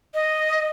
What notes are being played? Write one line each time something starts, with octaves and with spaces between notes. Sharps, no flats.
D#5